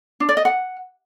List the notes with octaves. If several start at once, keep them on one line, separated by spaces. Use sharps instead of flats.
D4
D5
D#5
F#5